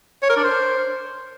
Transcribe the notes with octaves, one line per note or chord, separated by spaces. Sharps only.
C#5
A#4
D4
C5